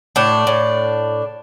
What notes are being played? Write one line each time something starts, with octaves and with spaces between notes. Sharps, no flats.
A2 D4
A2